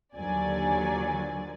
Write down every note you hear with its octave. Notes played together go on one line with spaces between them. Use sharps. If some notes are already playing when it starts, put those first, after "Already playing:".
D#2 D3 F3 F#3 D5 G#5